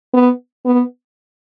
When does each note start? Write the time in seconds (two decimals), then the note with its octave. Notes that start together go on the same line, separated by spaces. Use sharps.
0.14 B3
0.66 B3